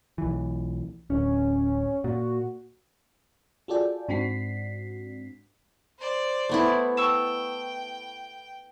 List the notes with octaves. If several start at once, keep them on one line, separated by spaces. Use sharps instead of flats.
B1 E3
D1 C#4
A#2 F#4
F4 F#4 G#4 A4 D5 G5
G#2 C4 D4 F#4 B6 C7
C5 D5
A3 B3 E4
G5 A5 C#6 E6